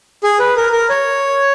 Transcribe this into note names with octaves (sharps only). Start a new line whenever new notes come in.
G#4
B4
A#4
A#4
C#5